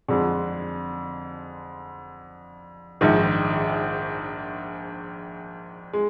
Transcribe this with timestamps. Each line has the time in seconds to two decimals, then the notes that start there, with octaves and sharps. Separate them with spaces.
0.08 F2 D3 G#3
3.01 A#1 G#2 D#3
5.94 G#3